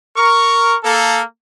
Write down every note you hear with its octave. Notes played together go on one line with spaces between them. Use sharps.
A#4 C#6
A#3 A4